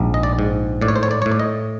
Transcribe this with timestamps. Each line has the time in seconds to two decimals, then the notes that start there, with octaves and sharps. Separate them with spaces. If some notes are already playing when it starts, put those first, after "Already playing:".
Already playing: A#1 G#2
0.14 D#5
0.23 D5
0.39 G#2
0.82 A2 D5
0.88 C#5
0.96 C5
1.03 C#5
1.11 D5
1.22 C#5
1.26 A2
1.32 D5
1.39 D#5